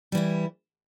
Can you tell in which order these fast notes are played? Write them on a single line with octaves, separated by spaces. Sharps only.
G3 E3 E4